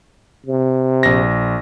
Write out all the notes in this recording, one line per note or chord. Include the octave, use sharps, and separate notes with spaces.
C3
A#1 A#6